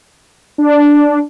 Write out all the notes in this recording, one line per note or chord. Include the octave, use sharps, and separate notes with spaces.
D4